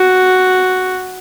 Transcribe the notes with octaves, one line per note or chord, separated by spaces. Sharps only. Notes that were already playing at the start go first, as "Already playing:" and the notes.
Already playing: F#4